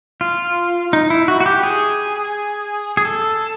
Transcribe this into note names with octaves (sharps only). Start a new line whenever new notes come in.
F4
D#4
E4
F#4
F#4
G4
G#4
G#4
A4